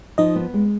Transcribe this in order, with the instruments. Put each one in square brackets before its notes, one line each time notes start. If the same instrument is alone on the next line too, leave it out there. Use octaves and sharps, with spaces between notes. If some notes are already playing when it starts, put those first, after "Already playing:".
[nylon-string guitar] F3 [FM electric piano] D#4 D#5
[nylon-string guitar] B3
G#3